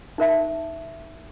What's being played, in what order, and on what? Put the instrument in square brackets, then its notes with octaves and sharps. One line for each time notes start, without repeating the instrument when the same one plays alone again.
[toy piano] D#4 A#4 E5 A5